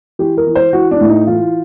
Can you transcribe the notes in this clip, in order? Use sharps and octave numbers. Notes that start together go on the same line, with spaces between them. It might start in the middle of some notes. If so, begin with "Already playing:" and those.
E3 G4
A#4
E3
C5
E3 F#4
D4
A2
D#4
E3 F4